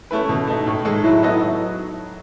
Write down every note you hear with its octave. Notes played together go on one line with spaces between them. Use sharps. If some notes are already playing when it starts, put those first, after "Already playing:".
A3 C#4 E4 B4
B2
A3 D#4
A2
G#3 D#4 A4
F#3 E4
B3 D#4 A4 D#5
F#3